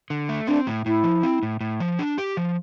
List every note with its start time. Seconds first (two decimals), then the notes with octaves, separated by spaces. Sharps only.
0.10 D3
0.29 A3
0.47 C4 D4
0.67 A2
0.85 A2 E4
1.04 F3
1.23 C4
1.43 A2
1.61 A2
1.80 F3
1.99 D4
2.18 G4
2.37 F3